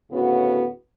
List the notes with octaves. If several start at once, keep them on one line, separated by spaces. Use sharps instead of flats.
D2 A2 C#3 B3 F#4